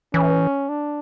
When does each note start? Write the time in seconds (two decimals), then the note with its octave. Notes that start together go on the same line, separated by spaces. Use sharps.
0.14 E3 C#4
0.69 D4